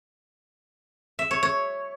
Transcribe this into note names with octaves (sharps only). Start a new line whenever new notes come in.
E5
C#5
C#5